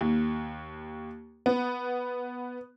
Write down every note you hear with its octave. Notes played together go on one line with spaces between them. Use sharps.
D#2
B3